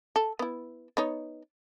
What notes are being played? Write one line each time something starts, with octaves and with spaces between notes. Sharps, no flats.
A4
B3 E4
B3 D#4 C#5